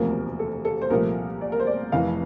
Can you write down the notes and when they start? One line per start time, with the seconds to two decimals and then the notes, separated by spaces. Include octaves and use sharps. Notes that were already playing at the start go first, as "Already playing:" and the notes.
Already playing: E1 D2 C3 F3 A#3 A#4
0.39 A4
0.65 A4
0.81 C5
0.90 C2 A#2 F3 A3 A#4
1.41 D5
1.52 A#4
1.60 C5
1.67 D5
1.92 F1 F2 E3 F5